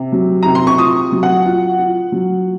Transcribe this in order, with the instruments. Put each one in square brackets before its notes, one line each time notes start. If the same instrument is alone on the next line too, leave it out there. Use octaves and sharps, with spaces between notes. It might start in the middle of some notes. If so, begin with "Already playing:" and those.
Already playing: [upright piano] C3
F#3
C3 A#5
C6
C#6
F4 D#6
F#3
F#5
F4
F4
F#3